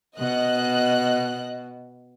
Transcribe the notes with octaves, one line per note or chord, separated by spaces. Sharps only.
B2 D#5 F#6